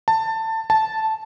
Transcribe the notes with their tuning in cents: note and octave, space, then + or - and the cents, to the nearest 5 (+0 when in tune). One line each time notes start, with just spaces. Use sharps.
A5 +20
A5 -5